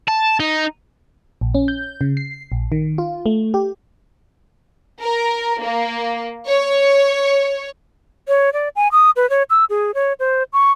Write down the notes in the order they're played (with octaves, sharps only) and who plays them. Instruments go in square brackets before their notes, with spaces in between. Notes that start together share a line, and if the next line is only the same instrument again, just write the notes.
[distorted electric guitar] A5
D#4
[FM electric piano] A#1
C#4
G6
C#3
C7
A#1
D#3
F4
A3
G4
[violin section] A#4
A#3
C#5
[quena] C#5
D5
G#5
D#6
B4
C#5
E6
G#4
C#5
C5
C#6